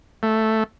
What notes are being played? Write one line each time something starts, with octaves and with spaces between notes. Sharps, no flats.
A3